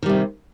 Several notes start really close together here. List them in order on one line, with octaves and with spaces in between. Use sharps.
D#3 G3 C3